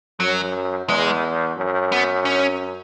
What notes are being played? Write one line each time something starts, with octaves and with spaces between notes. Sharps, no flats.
F#2 F#3
E2 G#3
F#2
B3
C#4